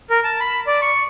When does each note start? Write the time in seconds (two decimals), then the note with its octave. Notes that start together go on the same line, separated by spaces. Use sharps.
0.10 A#4
0.24 A5
0.40 B5
0.67 D5
0.82 C#6